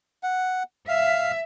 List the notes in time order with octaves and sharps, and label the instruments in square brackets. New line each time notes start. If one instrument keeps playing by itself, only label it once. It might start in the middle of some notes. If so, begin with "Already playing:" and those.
[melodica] F#5
[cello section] E5 [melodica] F5